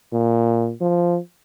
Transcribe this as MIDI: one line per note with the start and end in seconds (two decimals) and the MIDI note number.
0.13 0.72 46
0.81 1.19 53